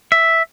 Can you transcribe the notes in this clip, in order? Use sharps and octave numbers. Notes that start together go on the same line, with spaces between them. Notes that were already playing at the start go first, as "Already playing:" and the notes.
E5